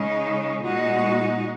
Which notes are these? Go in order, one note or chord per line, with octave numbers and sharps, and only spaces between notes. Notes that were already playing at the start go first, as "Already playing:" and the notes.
Already playing: C#3 G#3 D#4
A#2 G#3 D#4 F#4